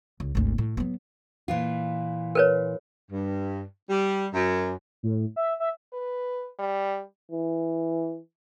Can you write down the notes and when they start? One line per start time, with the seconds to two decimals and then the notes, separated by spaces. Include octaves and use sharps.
0.20 C#2
0.35 G#1 D2
0.58 A2
0.77 F#3 B3
1.48 A#2 E3 F4
2.35 A#4 B4 C#5
3.11 G2
3.89 G3
4.33 F#2
5.03 A2
5.36 E5
5.60 E5
5.93 B4
6.59 G3
7.31 E3